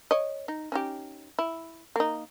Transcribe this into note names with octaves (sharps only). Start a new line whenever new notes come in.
C#5 D#5
D#4
C#4 D#4 G4
E4
A#3 D#4